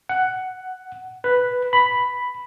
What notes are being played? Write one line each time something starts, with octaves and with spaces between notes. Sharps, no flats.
F#5
B4
B5